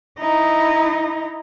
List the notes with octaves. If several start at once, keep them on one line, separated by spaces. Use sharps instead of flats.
D#4 E4